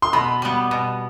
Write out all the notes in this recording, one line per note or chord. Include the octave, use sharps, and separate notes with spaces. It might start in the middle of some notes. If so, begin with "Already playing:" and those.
C6
B2 B5
G3 B3
B2